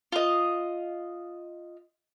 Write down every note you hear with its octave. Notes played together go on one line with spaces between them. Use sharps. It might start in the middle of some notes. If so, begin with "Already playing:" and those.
F4 D#5